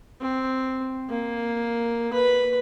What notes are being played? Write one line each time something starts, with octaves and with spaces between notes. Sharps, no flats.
C4
A#3
B4 B5